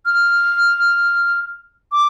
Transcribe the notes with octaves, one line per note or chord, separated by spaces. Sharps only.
F6
D6